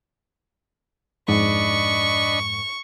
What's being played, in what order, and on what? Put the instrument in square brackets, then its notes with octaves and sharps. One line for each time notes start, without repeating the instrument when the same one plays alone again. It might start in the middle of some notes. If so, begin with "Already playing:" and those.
[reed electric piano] F2 G#2 [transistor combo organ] D4 D#5 B5 [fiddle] C#6